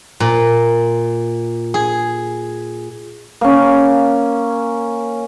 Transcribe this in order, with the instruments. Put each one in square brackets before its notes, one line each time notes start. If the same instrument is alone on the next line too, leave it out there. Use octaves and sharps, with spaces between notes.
[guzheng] A#2
G#4
[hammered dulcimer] A#3 C#4